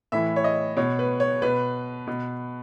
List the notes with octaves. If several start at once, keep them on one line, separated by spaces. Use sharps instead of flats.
A2 E3 E5
C#5
D#5
B2 C#5
B4
C#5
B2 B4
B2